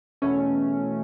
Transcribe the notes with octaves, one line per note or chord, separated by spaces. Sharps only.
E2 B2 A3 C#4